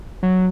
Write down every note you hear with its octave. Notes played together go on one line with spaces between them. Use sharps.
F#3